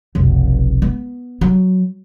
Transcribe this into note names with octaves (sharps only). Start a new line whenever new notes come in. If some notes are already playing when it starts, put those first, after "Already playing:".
F1 B1
B3
F#3